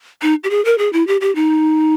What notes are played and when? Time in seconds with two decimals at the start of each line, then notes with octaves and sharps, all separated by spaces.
0.22 D#4
0.44 G4
0.50 G#4
0.65 A#4
0.78 G#4
0.93 E4
1.07 G4
1.21 G4
1.35 D#4